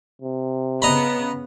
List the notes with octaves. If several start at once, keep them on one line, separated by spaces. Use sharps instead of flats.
C3
C#3 B3 D#5 A#5 B5